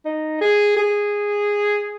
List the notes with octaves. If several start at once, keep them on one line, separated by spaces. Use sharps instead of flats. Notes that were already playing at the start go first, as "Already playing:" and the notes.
D#4
G#4
G#4